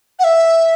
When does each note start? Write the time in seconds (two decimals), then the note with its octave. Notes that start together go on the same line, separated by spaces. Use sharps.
0.19 F#5
0.24 E5